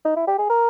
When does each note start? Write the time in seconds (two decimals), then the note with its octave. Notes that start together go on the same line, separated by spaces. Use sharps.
0.05 D#4
0.17 E4
0.27 G4
0.39 G#4
0.49 A#4